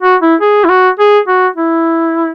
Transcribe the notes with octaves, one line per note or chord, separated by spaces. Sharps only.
F#4
E4
G#4
E4
F#4
G#4
F#4
E4